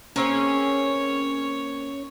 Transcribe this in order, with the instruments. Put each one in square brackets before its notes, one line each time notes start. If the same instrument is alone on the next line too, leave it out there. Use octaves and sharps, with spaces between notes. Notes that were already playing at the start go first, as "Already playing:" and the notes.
[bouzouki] A#3 C4 G#4 [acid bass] C#4 [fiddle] C#5